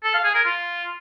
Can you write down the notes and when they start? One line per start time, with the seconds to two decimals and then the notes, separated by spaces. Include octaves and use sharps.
0.03 A4
0.14 F5
0.24 G#4
0.35 A#4
0.45 F4